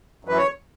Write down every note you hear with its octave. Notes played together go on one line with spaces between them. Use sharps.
F#2 E3 B4
C#5